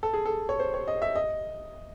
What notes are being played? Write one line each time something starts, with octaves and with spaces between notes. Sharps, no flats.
A4
G#4
A4
C#5
C5
C#5
D#5
E5
D#5